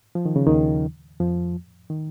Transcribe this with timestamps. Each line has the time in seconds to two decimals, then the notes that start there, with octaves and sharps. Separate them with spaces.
0.15 F3
0.26 D#3
0.36 C#3
0.47 D#2 D#3
1.20 F2 F3
1.90 D#3